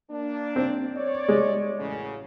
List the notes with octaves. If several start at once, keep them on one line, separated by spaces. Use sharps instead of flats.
A#3 D4
C4
C#5 D5
G#3
A1 F#2 C#3